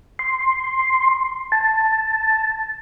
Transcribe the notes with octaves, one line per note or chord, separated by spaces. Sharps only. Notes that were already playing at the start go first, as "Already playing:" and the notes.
C6
A5